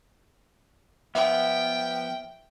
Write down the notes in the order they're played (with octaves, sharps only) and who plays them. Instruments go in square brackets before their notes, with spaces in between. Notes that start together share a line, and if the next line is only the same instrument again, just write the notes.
[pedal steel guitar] F3 B3 [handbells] E5 [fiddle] G5